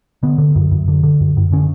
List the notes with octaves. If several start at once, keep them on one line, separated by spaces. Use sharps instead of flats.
D3 B3
D3
F#2
F#2
D3
D3
F#2
F#2
D3 C#4